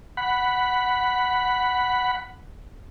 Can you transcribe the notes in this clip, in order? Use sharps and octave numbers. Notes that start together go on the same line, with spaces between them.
F#5 B5